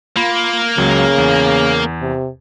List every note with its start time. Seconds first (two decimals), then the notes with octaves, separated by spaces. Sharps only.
0.16 A#3 F4 B5
0.78 C#2 C#3 F#3
1.18 E2
2.01 C3